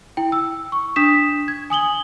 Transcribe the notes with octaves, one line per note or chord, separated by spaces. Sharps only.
E4 G5
E6
C#6
D4 D#6 B6 E7
G#6
G#5 D#6 F#7 G7